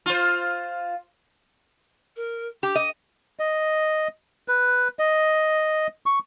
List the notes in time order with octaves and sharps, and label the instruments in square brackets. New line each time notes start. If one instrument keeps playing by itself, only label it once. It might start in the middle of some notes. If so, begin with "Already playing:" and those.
[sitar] F4 C5
[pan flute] A#4
[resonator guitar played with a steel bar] G4 [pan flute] D6
[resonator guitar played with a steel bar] D#5
[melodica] D#5
B4
D#5
C#6